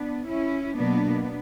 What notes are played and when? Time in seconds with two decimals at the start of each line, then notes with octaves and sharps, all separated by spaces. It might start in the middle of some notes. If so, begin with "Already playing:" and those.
Already playing: B3 D4
0.26 C#4 E4
0.76 B2 F#3 A#3 B3 D4